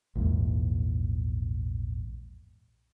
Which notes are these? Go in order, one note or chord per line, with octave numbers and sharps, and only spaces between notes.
A#1 E2 G#2